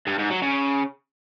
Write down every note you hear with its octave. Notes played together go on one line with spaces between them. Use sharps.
G2
G#2
F#3
C#3